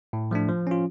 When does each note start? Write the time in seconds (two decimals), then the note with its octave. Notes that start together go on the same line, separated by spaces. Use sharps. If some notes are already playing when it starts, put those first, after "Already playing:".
0.13 A2
0.31 F3 A3 D4
0.49 F3
0.67 C#4 F4